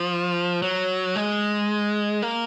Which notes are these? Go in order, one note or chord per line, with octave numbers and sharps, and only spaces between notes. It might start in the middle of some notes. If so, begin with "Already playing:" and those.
Already playing: F3
F#3
G#3
A#3